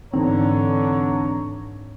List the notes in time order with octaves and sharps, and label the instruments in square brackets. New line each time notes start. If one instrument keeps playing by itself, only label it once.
[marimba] G#2 D4 D#4 [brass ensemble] D3 [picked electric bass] E3 C4 [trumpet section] C#5 A#5